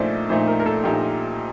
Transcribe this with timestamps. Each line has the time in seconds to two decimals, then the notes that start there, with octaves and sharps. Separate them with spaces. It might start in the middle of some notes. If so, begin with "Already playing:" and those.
Already playing: A#1 A#2 A3 D#4 C5 D5
0.29 A#1 A#2 A3 D#4 C5
0.47 A#4
0.60 A#4
0.66 A4
0.84 A#1 A#2 A3 D#4 G4